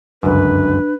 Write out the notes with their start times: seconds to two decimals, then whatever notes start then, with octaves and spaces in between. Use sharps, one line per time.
0.23 G1 C#2 F#2 D4 B4